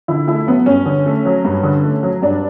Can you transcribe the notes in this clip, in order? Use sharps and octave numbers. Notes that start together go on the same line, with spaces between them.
D3 E4
A3 E4
F#3 B3
G2 C#4
D3
A3
F#3
G2
D3
A3
F#3
G2 D4